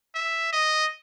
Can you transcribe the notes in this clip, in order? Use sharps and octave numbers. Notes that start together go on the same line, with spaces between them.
E5
D#5